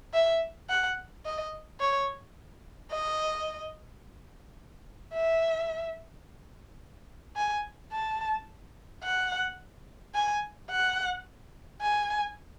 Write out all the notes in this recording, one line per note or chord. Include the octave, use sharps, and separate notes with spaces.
E5
F#5
D#5
C#5
D#5
E5
G#5
A5
F#5
G#5
F#5
G#5